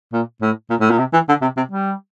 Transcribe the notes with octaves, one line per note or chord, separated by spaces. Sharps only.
A#2
A2
A#2
A2
A#2
C3
E3
D3
C3
C3
G3